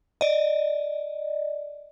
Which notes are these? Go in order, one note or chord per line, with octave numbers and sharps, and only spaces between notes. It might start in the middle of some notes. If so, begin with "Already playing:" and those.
D5 D#5